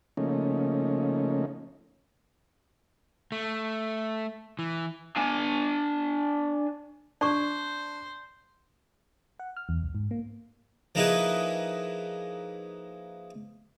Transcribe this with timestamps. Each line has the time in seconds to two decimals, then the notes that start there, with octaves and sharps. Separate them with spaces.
0.17 C#3 F3 A3 A#3 C#4 D#4
3.32 A3
4.59 E3
5.17 D4 G#5
7.21 D4 C5 D5 C#6
9.39 F#5
9.57 F6
9.69 E2
9.83 C2
9.95 G#2
10.11 A#3
10.95 F3 A#3 D#4 E4 G#4 B4